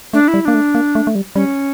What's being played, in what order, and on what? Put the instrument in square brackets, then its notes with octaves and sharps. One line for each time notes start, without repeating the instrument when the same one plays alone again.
[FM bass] A3 [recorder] D4
[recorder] E4
[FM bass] G3
[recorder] E4
[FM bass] A#3 [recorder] D4
[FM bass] A3
A#3
A3
A3
G3
[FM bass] G3 [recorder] C#4